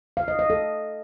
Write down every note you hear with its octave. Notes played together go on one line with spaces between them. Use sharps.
F5
D#5
D#5
A4